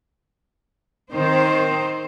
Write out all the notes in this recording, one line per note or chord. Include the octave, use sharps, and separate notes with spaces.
D#3 C4 C5